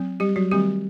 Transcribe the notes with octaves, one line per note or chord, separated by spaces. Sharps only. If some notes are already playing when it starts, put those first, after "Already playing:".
Already playing: F#3 C4
G3 G4
F#3 F#4
D#3 G3 A3 C4 G4